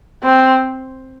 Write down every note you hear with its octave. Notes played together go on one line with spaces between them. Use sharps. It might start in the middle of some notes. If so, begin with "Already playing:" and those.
C4